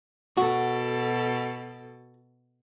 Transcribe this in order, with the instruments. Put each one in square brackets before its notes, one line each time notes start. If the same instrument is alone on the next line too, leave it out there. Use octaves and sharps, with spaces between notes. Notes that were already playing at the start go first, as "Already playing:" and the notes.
[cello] B2 A4 [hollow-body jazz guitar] F#4